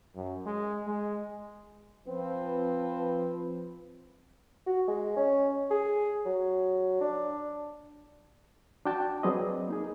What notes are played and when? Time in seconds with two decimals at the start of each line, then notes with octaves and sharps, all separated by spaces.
0.15 F#2
0.46 G#3
0.87 G#3
2.08 F3 C4 B4
4.67 F#4
4.88 G#3
5.16 C#4
5.70 G#4
6.26 F#3
7.01 D4
8.85 D4 F#4 G5 A5
9.23 F#3 C4 G#4 B4 D5 D#5
9.68 A#3 D#4 G#4